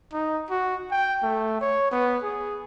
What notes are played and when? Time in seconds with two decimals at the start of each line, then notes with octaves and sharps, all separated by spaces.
0.13 D#4
0.50 F#4
0.92 G5
1.23 A3
1.61 C#5
1.92 B3
2.23 G#4